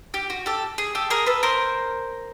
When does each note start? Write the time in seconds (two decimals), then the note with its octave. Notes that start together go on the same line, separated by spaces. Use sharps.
0.14 G4
0.30 F#4
0.46 G4 A4
0.78 G#4
0.95 G4 A4
1.10 G#4 A#4
1.26 A4 B4
1.43 A#4 C5